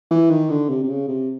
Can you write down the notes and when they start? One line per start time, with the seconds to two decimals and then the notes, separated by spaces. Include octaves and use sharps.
0.10 E3
0.30 D#3
0.50 D3
0.69 C3
0.83 C3
0.89 C#3
1.08 C3